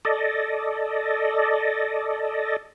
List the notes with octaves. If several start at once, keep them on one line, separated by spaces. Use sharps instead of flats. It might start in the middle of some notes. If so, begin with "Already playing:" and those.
A4 D5 D#5